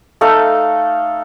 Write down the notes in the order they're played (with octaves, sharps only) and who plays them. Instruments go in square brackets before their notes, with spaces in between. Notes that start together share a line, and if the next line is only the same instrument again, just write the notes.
[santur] A3 D#4 A4 F5